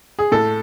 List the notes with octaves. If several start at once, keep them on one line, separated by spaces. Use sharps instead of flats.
G#4
A2 A4